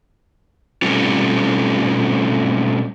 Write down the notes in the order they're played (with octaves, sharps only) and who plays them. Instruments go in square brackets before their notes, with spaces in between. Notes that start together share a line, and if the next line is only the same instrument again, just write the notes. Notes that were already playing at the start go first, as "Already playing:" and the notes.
[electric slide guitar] B2 G3 A3 C4 C#4 F4